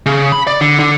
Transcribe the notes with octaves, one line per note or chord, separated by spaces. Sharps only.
C#3
B5
D5
D3
D3